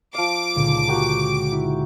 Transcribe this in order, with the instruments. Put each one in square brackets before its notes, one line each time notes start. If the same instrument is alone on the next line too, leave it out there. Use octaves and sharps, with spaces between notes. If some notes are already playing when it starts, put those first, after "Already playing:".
[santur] F3 F5 [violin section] D6
[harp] C#2 A#2 D3
[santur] F#4 G4 A#4
[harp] E4